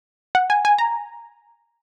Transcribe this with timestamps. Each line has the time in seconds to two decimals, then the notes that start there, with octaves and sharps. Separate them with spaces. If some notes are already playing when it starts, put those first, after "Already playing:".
0.35 F#5
0.50 G#5
0.65 G#5
0.78 A#5